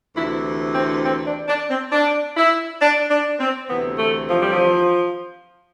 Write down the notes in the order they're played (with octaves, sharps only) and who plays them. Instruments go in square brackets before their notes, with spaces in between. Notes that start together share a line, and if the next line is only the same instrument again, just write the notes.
[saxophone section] D2 C3 E3 E4
C4
C4
D4
D4
C4
D4
E4
D4
D4
C4
D2 C3 E3 B3
A3
F3
G3
F3